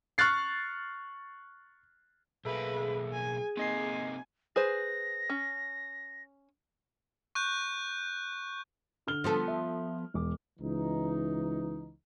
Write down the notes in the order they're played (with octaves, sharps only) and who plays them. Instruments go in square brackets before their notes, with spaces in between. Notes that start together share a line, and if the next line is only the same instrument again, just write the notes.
[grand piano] C#6 F6 F#6 A6 C7
[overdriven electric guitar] B1 A#3 [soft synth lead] G#4 [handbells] A4 E5 [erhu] B4
[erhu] G#5
[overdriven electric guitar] C3 D#4 [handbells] A#3 D#5 C7 [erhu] G#5
[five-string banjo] G#4 B4 C5 [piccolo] A#6
[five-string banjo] C#4
[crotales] C#6 F#6 G6
[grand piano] D3 F6 G7
[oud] F3 B3 A4
[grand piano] E5
E1 D6
[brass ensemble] C#2 E3 D#4